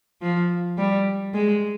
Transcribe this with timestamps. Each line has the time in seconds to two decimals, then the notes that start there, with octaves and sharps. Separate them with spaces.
0.22 F3
0.78 G3
1.34 G#3